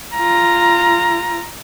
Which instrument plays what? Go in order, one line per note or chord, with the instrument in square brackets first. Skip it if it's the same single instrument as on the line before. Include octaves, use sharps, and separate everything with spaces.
[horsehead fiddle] F4 A#5